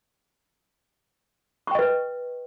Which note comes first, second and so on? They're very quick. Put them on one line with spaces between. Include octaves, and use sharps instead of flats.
C#6 G5 D#5 B4